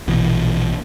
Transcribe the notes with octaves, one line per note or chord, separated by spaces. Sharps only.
A#1 B2 E3